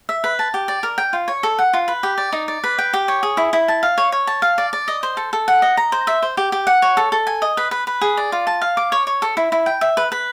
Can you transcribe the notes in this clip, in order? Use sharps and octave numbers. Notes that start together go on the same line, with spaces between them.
E5
B4
A5
G4
D5
A#4
G5
F4
C#5
A4
F#5
F4
B4
G4
D5
D#4
D5
B4
G5
G4
C#5
G#4
E4
E4
A5
F5
C#5
C#5
A5
F5
D5
D5
D#5
C5
A4
A4
F#5
D#5
A#5
C5
E5
C5
G4
G4
F#5
C#5
A4
A4
G#5
D#5
B4
B4
B4
G#4
D5
F4
A5
F5
D6
C#5
C#5
A4
E4
E4
G5
E5
B4
B4